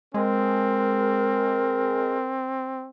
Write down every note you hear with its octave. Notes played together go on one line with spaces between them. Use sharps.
G#3 C4 A#4